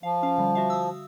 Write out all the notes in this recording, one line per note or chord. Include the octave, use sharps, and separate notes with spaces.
F3 F5
C#4 F5
D3 G3
F#4 E5 F5
D#6 E6